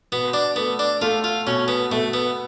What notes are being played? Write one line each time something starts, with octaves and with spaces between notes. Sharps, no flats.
B2 B3
D4
A3 B3
D4
A3 F4
F4
B2 C#4
B3
B2 A3
B3